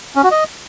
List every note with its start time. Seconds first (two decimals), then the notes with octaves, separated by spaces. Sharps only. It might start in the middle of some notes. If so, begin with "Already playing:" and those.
0.16 C#4
0.23 F#4
0.31 D#5